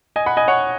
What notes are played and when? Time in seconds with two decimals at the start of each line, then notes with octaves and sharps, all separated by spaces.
0.16 D#5 G#5
0.26 F#5 B5
0.37 D#5 G#5
0.48 C#5 F#5